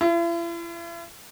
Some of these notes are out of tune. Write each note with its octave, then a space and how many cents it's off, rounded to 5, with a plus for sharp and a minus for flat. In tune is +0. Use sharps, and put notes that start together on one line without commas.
E4 +45